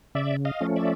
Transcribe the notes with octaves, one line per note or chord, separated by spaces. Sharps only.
C#3 D5 E5
D#5 F5
F3 A3 C#4
D5 E5